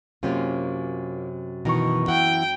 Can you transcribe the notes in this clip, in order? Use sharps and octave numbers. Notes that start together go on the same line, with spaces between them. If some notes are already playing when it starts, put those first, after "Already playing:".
F#2 C3 A#3 C#4 F4
B2 D#3 E3 A#5 C#6
E3 E4 F#5 G5